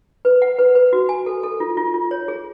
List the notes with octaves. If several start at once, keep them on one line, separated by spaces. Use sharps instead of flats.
B4
F#5
B4
B4
F#4
G#5
A4
A4
F4
F4
F4
C#5
G#4